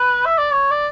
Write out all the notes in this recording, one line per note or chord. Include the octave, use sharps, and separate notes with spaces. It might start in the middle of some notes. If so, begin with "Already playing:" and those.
Already playing: B4
E5
D5
C#5
D5